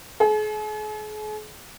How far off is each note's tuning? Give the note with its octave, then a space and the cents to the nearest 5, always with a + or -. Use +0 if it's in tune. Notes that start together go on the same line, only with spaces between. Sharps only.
G#4 +45